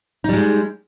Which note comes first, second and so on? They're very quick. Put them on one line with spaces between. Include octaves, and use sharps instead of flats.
D#4 G3 G#3